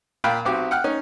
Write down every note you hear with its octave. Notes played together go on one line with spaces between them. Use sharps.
A#2 F5 G5 B5 F#6
B1 C4 F#4 G4 D6
F#5 G5 F6 F#6
C#4 D#4